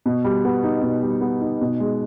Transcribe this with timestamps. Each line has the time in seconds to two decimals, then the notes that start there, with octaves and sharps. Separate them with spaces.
0.06 B2
0.24 G3
0.45 B3
0.64 D#4
0.82 B2
1.02 G3
1.21 B3
1.41 D#4
1.61 B2
1.80 G#3